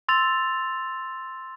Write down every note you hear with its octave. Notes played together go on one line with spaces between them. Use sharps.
C6 E6 A6 F7